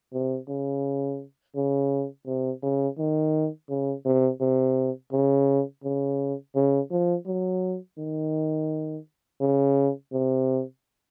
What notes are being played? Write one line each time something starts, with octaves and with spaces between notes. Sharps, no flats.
C3
C#3
C#3
C3
C#3
D#3
C#3
C3
C3
C#3
C#3
C#3
F3
F#3
D#3
C#3
C3